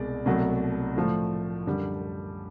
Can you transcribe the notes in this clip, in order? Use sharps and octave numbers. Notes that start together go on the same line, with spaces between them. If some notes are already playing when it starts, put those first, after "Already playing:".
Already playing: C2 B2 G#3 D5
C2 B2 F#3 A3
A2 F3 A3
F#2 D3 G3